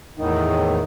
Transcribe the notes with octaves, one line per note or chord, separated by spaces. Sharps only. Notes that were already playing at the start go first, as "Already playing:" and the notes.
E2 A2 D#3 D#4